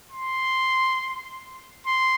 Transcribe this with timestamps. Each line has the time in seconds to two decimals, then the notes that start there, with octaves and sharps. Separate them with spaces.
0.12 C6
1.86 C6